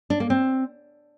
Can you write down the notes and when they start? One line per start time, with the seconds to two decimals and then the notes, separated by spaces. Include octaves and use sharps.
0.10 D4
0.20 A#3
0.30 C4